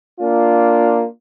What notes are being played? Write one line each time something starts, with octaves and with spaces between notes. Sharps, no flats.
A#3 D4 F4